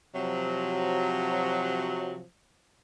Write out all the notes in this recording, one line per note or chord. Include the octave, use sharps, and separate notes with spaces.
C3 F3 F#3